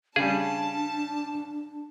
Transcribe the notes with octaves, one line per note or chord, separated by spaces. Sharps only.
C#3 G3 D4 G#4 A5